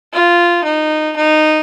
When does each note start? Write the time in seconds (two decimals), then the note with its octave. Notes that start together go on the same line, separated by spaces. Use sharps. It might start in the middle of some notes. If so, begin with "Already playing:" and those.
0.13 F4
0.64 D#4
1.17 D#4